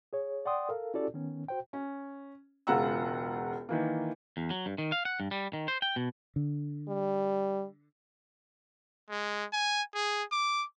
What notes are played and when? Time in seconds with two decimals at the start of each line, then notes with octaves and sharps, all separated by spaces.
0.13 G#4 C#5
0.45 D5 F#5 G5 C6 D#6
0.69 A4 A#4 F5
0.94 C#4 E4 F#4 G4 A4 D5
1.14 D#3 B3 C#4
1.48 F#4 C5 G5
1.73 C#4
2.67 E1 C#2 F4 F#5 A#5 E6
3.69 D#3 E3 A#3
4.37 E2
4.50 F#3
4.66 G2
4.78 D#3
4.92 F5
5.05 F#5
5.20 G2
5.31 G3
5.53 D#3
5.68 C5
5.82 G5
5.96 B2
6.36 D3
6.88 G3
9.10 G#3
9.53 G#5
9.94 G#4
10.32 D6